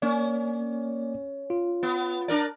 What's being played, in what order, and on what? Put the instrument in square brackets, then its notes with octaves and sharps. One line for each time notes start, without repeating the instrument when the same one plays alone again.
[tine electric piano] A#3 D5 [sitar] C#4
[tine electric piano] F4
[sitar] B3
D4 A#4 D5